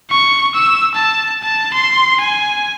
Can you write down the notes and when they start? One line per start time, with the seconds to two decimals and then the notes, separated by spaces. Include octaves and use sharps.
0.10 C#6
0.55 E6
0.95 A5
1.42 A5
1.74 C6
2.20 G#5